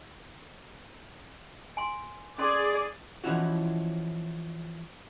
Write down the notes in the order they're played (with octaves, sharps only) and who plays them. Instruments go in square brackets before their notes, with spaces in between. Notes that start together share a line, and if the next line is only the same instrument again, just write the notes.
[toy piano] G#5 C6
[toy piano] C#4 A4 C6 [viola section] G#4 D5
[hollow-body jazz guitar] B2 E3 F3 C#4 E4 F#4